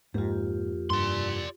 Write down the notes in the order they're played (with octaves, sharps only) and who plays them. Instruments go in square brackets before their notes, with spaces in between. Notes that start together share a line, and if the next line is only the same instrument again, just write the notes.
[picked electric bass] F2 A#3 [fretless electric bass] G#2 [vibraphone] F4 G4
[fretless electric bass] G2 [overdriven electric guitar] D5 C6